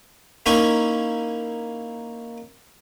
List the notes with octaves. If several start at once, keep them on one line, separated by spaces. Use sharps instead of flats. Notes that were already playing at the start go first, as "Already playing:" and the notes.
A#3 C#4 D#4 E4 C#5 G#5